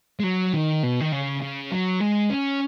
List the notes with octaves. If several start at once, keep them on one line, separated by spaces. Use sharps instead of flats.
G#3
F#3
D#3
B2
D#3
C#3
C#3
F#3
G#3
C#4